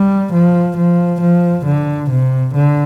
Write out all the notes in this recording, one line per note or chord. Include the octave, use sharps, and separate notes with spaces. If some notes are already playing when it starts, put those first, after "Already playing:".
Already playing: G3
F3
F3
F3
D3
C3
D3